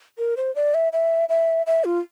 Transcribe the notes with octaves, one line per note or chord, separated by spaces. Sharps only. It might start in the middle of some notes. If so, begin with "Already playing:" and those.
A#4
C5
D5
E5
E5
E5
E5
F4